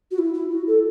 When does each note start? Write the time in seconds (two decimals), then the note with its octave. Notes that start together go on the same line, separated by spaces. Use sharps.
0.11 F#4
0.18 E4
0.34 E4
0.51 F#4
0.67 A4